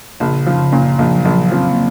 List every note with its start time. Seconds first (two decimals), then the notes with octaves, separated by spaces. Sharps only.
0.20 A#1 C#3
0.46 F3
0.59 C#3
0.72 A#2
0.99 A#1 F3
1.16 F#3
1.25 A#1 F3
1.52 F3 C4
1.69 A#3